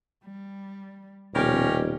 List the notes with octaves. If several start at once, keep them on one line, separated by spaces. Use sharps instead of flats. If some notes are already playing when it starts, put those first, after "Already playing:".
G3
D#1 B2 F3 C#4 G4 A#4